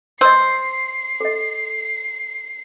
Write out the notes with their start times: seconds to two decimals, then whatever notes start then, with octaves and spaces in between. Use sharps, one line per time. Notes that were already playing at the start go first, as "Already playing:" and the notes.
0.21 C5 D#5 D#6 E6 C7
1.21 A4 D#5